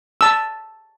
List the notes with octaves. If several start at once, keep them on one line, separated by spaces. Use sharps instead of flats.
A5 E6